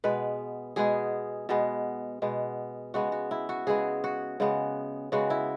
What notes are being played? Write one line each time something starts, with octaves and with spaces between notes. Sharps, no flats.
B2 G#3 B3 B4
B2 G#3 B3 G#4
B2 G#3 B3
B2 G#3 B3
C#3 G#3 B3 F#4
F#4
E4
F#4
C#3 G#3 B3 G#4
F#4
C#3 G#3 B3
C#3 G#3 B3 F#4
E4